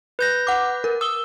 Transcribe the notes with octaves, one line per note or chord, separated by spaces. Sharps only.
B4 G6 A#6
F#5 D6
A#4
D#6 E6 G7